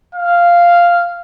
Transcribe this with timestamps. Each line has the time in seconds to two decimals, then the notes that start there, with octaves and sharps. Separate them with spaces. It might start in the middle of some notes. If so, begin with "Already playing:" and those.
0.15 F5